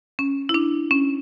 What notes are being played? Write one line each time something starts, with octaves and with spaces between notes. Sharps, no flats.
C#4
E4
D4
C#4